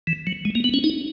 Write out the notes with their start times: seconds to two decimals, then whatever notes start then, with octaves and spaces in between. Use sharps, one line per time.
0.07 E3
0.27 F#3
0.45 G#3
0.55 A#3
0.64 B3
0.74 C#4
0.84 D#4